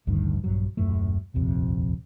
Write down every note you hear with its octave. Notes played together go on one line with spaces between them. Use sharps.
A1 D2 G2 D#3
A#1 G2 F#3
D#1 F#2 A2 A3
D#1 A#1 F2 C3